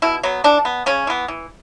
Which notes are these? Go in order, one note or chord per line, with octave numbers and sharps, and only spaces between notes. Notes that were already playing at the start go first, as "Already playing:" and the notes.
B2 E4
F#3 B3
E3 D4
B3
C#3 C#4
E3 B3
E3